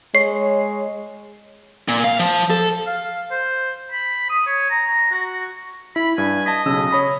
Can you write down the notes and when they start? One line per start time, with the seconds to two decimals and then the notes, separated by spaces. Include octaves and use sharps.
0.15 G#3 C#5 C7
1.88 A#2
2.04 F5
2.19 F3
2.50 A4
2.87 F5
3.31 C5
3.91 B5
4.30 D#6
4.46 C#5
4.70 A#5
5.11 F#4
5.96 E4 B5
6.18 G2 G#5
6.46 D#5 A5 B6
6.65 B1 C#3 E6
6.91 C#5 B5 D#6